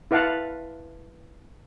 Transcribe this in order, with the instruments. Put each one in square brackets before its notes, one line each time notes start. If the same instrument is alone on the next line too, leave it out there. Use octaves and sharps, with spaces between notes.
[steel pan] E4 B4 F5 F#5 A5